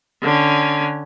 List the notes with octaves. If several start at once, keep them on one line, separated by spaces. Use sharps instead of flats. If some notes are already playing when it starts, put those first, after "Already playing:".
D3 C#4